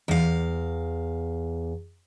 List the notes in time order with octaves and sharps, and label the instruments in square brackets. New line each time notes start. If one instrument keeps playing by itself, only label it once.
[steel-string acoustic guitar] E2 F5